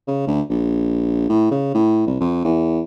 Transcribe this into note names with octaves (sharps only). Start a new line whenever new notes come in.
C#3
D2
A#1
A2
C#3
A2
C2
F2
E2